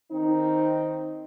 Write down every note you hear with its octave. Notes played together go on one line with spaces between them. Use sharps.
D#3 C4 D#4